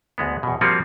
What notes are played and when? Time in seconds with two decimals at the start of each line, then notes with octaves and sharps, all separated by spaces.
0.18 D2 G#3 B3
0.43 E2 B2
0.61 F3 G3 A#3 C4 F4 F#4